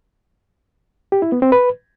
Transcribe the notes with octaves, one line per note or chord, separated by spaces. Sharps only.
G4
E4
B3
C4
B4